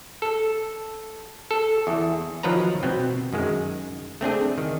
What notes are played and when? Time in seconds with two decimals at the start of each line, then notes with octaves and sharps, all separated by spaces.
0.22 A4
1.51 A4
1.87 E2
2.43 D#3 F3 F#3 B4 A5 A#5
2.83 B2 B3 C4
3.33 F#2 D#3 G#3
4.21 A3 C4 D4 G#4
4.58 D#3